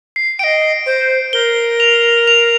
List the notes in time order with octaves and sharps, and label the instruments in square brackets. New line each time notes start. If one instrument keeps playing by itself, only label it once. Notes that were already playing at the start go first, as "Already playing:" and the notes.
[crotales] C7
[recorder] D#5 G5 [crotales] D7
[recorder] C5
[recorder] A#4 [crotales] G7
[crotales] F7
F7